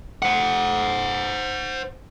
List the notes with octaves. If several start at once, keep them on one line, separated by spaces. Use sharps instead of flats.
C5 F#5